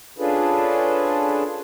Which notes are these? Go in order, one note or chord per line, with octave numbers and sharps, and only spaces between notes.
C#4 D4 F4 G#4 A4 B4